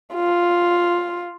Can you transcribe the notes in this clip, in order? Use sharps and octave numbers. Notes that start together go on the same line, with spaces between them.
F4